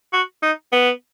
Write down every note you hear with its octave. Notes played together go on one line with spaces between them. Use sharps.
F#4
D#4
B3